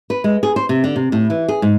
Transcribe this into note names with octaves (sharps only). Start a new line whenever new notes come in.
B4
G#3
G#4
C5
C3
D3
C3
A2
E3
G#4
G#2